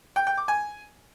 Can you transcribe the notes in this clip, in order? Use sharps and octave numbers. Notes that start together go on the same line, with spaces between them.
G5
G5
D6
G#5